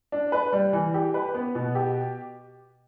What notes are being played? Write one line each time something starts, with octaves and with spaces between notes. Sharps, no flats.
D4
B4
G3
E3
G4
B4
B3
B2
G4